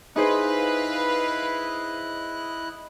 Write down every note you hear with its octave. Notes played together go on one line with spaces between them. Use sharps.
D#4 E4 G#4 B4 C5 D#5 F5 F#6